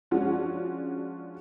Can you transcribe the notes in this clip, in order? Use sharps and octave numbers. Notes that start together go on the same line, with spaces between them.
F3 G#3 C#4 D4 F4 F#4